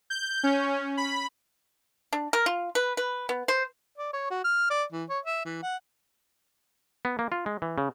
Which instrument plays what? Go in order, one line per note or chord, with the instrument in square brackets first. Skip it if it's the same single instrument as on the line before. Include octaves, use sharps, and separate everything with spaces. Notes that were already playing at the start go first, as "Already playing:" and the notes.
[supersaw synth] G6
C#4
B5
[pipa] D4
A#4
F4
B4
B4
B3
C5
[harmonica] D5
C#5
F#4
F6
D5
E3
C#5
E5
E3
F#5
[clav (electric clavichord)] B3
A#3
F4
G#3
E3
C#3